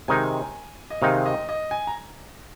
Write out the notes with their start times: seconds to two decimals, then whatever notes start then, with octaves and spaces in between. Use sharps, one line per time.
0.08 C3 D#3 G#3 D#4 G#5
0.90 D#5
1.01 C3 D#3 G#3 D#4 F5
1.26 D#5
1.49 D#5
1.71 G#5
1.87 A#5